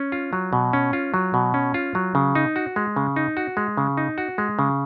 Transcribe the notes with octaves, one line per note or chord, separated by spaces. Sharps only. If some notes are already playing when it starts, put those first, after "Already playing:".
Already playing: C#4
F4
F#3
B2
C#4
F4
F#3
B2
C#4
F4
F#3
C#3
D#4
F#4
G#3
C#3
D#4
F#4
G#3
C#3
D#4
F#4
G#3
C#3